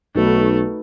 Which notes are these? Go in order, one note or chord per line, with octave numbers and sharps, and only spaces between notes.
B1 A3 D#4 F#4 B4